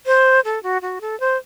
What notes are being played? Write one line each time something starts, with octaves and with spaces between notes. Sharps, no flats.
C5
A4
F#4
F#4
A4
C5